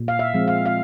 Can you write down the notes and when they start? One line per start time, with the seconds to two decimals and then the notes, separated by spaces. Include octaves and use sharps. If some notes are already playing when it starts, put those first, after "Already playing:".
Already playing: A#2
0.08 F5
0.19 E5
0.34 F3 G#3 C4
0.48 F5
0.66 F5